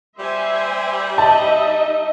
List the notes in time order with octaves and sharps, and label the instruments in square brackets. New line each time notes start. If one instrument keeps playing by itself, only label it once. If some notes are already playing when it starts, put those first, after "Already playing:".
[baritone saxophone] G3 [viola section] C5 E5 G#5
[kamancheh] D#4 D#5 [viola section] E5 [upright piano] A5